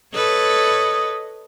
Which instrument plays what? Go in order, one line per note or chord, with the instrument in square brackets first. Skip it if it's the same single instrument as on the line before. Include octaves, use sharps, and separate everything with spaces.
[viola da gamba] A4 B4 C#5 [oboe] D#5